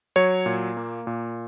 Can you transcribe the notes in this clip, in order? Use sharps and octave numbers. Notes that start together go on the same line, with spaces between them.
F#3 C#5
A#2
A#3
A#2